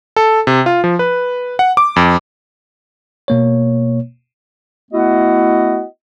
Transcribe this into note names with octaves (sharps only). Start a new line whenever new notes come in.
A4
C3
F4
F3
B4
F#5
D6
F2
B2 A#3 C#5
A3 B3 E4 F#4 D#5 F#5